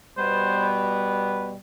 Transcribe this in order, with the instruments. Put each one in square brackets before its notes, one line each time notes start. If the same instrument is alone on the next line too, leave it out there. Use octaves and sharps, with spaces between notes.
[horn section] B2 G3 B3 C5